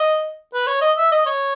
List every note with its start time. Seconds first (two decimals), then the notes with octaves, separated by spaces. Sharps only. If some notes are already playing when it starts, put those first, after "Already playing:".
Already playing: D#5
0.54 B4
0.67 C#5
0.82 D#5
0.97 E5
1.12 D#5
1.26 C#5